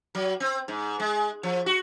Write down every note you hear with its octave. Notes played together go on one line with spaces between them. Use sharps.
F#3
C4
G#2
G#3
F3
F#4